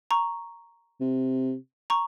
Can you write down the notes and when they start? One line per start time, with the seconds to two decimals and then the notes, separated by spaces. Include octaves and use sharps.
0.11 A#5 C#6
1.00 C3
1.90 A#5 C#6